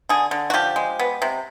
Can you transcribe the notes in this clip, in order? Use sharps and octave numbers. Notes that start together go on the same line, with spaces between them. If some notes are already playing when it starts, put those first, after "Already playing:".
D3 G#4
D3
F#4
F3 G4
G#3
B3
C3